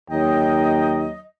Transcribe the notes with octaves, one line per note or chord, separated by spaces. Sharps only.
D#2 F#3 D#5 G5